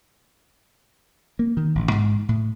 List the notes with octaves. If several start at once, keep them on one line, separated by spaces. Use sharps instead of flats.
A#3
D#3
A1
G#2
A2